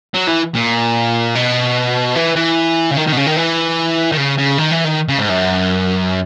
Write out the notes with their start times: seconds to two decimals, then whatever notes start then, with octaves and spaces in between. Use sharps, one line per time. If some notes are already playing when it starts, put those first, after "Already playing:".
0.14 F#3
0.28 E3
0.55 A#2
1.35 B2
2.16 E3
2.36 E3
2.91 C#3
2.97 D#3
3.07 D#3
3.12 B2
3.17 C#3
3.27 D#3
3.37 E3
4.12 D#3
4.17 C#3
4.38 C#3
4.58 D#3
4.71 E3
4.85 D#3
5.08 C#3
5.18 G#2
5.29 F#2